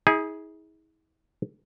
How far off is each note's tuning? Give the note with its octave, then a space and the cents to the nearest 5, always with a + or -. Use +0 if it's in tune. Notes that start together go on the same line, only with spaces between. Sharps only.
E4 -45 G#4 +0